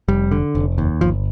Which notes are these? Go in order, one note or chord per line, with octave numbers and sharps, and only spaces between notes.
F1 G3
D3
F1
D#2
G1 F3